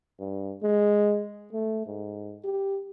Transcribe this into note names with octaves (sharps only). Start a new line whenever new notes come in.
G2
G#3
A3
G#2
G4